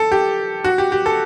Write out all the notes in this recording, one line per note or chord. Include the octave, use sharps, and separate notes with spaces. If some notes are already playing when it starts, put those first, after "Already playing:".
Already playing: A4
G4
F#4
G4
G4
A4